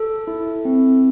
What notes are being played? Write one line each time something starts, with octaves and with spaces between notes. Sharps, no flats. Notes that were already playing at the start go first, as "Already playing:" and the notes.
Already playing: A4
E4
C4